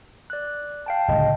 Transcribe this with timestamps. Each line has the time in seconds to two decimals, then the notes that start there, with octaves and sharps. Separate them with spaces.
0.30 D5 F#6
0.86 F5 G5 A5
1.08 D1 C#2 D#5